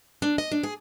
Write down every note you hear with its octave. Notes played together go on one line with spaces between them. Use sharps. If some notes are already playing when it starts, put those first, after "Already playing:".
D4
D#5
D4
G#4